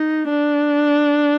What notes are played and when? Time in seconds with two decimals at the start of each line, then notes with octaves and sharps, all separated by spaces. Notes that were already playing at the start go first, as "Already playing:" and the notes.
Already playing: D#4
0.28 D4